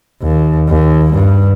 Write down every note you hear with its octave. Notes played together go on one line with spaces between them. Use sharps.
D#2
D#2
G2